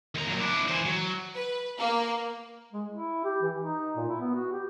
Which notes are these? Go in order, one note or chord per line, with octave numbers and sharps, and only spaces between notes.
D#2 A#5
A#2 F#3
D4 E4
E3 C5
F#3
B4
A#3
G#3
E4
G4
E3
D#4
A#2
E4
B3
F#4
G4